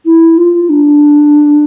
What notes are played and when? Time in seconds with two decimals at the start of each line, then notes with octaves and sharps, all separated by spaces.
0.06 E4
0.38 F4
0.69 D4